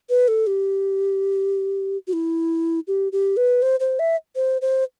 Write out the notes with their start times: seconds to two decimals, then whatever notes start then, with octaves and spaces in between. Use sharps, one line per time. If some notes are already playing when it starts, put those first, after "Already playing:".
0.09 B4
0.28 A4
0.47 G4
2.07 F#4
2.13 E4
2.87 G4
3.12 G4
3.37 B4
3.62 C5
3.80 C5
3.99 E5
4.36 C5
4.62 C5